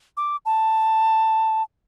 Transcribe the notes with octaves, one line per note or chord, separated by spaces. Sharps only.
D6
A5